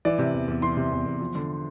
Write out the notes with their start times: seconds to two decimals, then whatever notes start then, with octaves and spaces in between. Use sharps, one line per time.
0.05 E3 D5
0.19 C3
0.33 E2
0.48 E2
0.62 E3 C6
0.77 C3
0.92 E2
1.06 E2
1.21 F3
1.35 D3